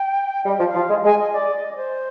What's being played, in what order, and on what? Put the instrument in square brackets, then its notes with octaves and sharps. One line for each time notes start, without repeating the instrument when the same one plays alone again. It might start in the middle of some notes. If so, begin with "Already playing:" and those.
Already playing: [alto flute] G5
[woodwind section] G3 [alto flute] D#5
[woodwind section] F3
[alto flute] F5
[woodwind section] F3
G#3
[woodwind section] G#3 [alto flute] G#5
[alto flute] D#5
D5
D#5
D5
C5